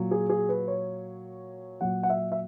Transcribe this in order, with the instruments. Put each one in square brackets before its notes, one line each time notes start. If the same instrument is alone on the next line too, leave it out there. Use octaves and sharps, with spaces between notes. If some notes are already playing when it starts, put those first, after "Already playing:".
Already playing: [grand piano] A#2 F#3
G#4
G#4
B4
C#5
A#2 F#3 F#5
F#5
E5
E5